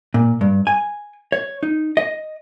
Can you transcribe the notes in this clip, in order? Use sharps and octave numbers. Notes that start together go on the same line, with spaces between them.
A#2
G2
G#5
C#5
D#4
D#5